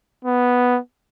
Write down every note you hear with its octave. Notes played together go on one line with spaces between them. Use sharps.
B3